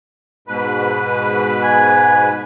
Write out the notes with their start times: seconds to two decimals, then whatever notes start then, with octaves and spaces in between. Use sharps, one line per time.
0.48 G#2 B2 B4
1.63 G#5